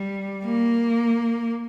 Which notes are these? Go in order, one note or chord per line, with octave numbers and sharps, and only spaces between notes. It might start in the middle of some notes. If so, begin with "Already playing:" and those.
Already playing: G3
A#3